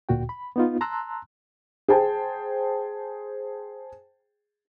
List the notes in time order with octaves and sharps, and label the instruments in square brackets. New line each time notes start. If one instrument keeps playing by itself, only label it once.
[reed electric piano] D2 A#2 F#4 G5
B5
B3 D#4 F4
A5 A#5 C6 E6 F#6
[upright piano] G#4 C5 G5 A5